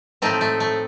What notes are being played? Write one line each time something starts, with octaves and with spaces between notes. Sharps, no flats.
A2 F3 A3 C4 D#4
A3
A3